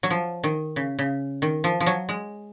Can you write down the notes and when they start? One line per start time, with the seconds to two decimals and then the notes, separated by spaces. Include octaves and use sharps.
0.03 F#3
0.10 F3
0.44 D#3
0.76 C#3
0.99 C#3
1.42 D#3
1.64 F3
1.80 F3
1.86 F#3
2.09 G#3